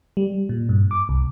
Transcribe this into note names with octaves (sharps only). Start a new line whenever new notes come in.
G3
A#2
G2
D6
C2